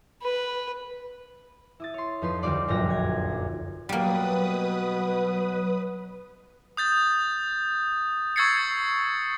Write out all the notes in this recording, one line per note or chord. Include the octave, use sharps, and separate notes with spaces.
B4
E4 D#6 A6
C#5 C6
F2 D#4 B4 C6
D2 G3 D#4 F4 D5 C6
F1 A#1 F#2 F4 G5 A#6
G#6
B2 F#3 G3 A#3 B4 D#6
D#6 G6 A6
C#6 E6 G#6 A6 C7 C#7